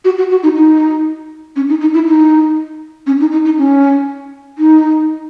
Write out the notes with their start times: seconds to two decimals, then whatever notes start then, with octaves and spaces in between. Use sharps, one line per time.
0.05 F#4
0.18 F#4
0.31 F#4
0.43 D#4
0.56 D#4
1.56 C#4
1.69 D#4
1.81 D#4
1.94 E4
2.07 D#4
3.07 C#4
3.20 D#4
3.32 D#4
3.45 D#4
3.58 C#4
4.58 D#4